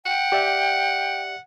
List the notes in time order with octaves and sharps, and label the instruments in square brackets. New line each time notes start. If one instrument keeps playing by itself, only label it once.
[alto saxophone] F#5 [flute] G5
[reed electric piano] G4 D5 E5